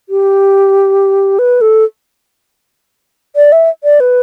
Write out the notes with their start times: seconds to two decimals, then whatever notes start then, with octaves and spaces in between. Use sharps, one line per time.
0.09 G4
1.39 B4
1.61 A4
3.36 D5
3.52 E5
3.84 D5
4.00 B4